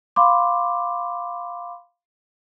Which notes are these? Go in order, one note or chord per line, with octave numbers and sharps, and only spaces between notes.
F5 B5 C6 D6